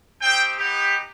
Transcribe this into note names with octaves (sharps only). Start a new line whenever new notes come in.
C4 D#4 G4 G5
B3 D#4 G4